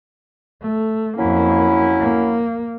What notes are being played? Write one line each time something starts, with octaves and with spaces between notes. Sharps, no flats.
A3
F2 F#3 A#3 C#4 E4
A#3